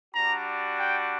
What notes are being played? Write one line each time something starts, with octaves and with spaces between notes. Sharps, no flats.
G3 D4 F#4 A#5
G5